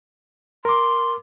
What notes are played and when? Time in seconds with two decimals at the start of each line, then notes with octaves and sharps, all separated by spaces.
0.65 A#4 C6 D6